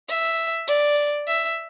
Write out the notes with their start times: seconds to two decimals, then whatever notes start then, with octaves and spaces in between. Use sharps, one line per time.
0.09 E5
0.68 D5
1.28 E5